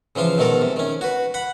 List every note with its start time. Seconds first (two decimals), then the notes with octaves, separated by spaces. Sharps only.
0.16 C#3 E3 F3 F4
0.38 B2 D#3 G#3 A4 A#4
0.61 C3
0.76 D#3 C#4
1.01 F#4 B4
1.34 F#5 B5